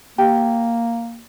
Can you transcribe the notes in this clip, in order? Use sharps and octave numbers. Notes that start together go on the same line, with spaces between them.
A#3 G4